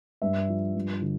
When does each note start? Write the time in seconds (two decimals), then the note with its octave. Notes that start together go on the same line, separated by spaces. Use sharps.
0.22 G2 E5
0.49 F3
0.75 G2
1.02 D3